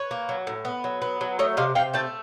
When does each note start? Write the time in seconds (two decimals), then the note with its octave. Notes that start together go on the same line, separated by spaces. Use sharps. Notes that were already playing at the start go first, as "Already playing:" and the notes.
Already playing: B4 C#5
0.11 A#3
0.29 F#3
0.47 A2
0.65 B3
0.84 F#3
1.02 B3
1.21 F#3
1.39 A3 C#5 D#5
1.57 C3 D#5 F5
1.75 C3 F5 G5
1.94 A3 G5 A5